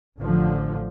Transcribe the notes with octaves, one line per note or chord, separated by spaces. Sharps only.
A1 D3 F3